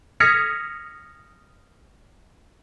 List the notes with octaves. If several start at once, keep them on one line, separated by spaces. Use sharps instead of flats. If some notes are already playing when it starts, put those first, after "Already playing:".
D#6 F6 G#6 A#6 B6 C#7